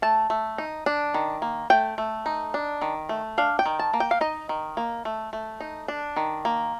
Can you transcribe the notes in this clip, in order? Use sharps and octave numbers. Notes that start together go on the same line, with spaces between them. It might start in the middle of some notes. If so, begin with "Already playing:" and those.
A3 A5
A3
D#4
D4
D#3
A#3
A3 G5
A3
D#4
D4
D#3
A3
D4 F5
G5
D#3
A5
A#3
G5
F5
D#4 D#5
D#3
A#3
A3
A3
D#4
D4
D#3
A#3